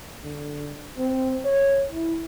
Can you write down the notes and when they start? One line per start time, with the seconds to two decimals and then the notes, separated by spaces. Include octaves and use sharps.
0.24 D3
0.98 C4
1.45 C#5
1.92 E4